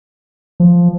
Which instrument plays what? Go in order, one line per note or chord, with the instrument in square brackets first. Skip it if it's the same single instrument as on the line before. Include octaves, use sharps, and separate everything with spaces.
[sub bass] F3